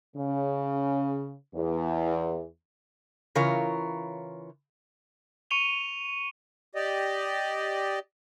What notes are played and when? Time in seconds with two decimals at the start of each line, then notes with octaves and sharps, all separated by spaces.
0.17 C#3
1.55 E2
3.35 C#3 E3 F4 A#4 C#5
5.51 C#6 C#7 D#7 F7 G7
6.75 G4 D5 D#5